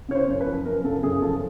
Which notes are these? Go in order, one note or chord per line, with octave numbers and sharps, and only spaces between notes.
C#3 C#5
C5
F#2
B4
F3
F#2 A#4
C#3 A4
F#2 G#4
F3 A4